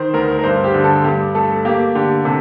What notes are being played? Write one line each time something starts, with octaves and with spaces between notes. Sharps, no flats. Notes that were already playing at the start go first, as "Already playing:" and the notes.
Already playing: D#3 C5
D2 A#4
A#4
G2 C5
G4
D3
A4
G2 G4
A3 A4
A#3 G4
D3 G4
C3 A4